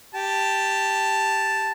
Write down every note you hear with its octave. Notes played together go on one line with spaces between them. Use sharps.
G4 A5